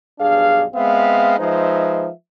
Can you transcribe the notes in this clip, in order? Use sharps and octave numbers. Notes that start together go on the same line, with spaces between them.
B1 G2 D4 G#4 F5
G#3 B3 C4 E5 F5
F3 G#3 D#4 B4 C5 E5